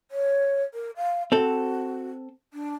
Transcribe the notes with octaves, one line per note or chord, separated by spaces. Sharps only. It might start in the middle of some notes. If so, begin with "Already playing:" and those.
C#5
A#4
F5
C4 F#4 A4
D4